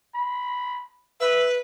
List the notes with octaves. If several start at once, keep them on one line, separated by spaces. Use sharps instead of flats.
B5
B4 E5